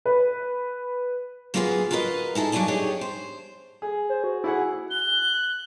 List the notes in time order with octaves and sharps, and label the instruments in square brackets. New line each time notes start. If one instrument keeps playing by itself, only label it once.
[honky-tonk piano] B4
[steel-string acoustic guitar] F#3 A#3 B3 F4 F#4 G#4
F4 F#4 A#4 B4 D5 D#5
D#4 E4 G#4 A4
G2 F#3 E4 D5 G#5 A5
D4 D#4 G4 G#4 C#5
C5
[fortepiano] G#4
[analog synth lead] C5
F#4
[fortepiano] E4 G#4 F#5
[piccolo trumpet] F#6 [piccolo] G7